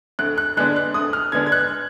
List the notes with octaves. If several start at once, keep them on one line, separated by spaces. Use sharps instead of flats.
D2 F#6
F#6
D3 G#3 B3 D4 F#6
F#6
D2 D#6
F6
D3 G#3 B3 D4 G#6
G#6
F#6